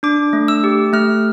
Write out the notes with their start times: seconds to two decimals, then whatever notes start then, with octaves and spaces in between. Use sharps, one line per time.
0.03 D4 D6
0.33 A3
0.48 E6
0.64 G4
0.93 A3 F6